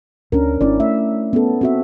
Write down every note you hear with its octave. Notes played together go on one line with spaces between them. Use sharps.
D2 C#4 D4 A#4
G#1 C#4 D4 E4 D5
A3 E5
B3 C#4 A4
C4 F#4 E5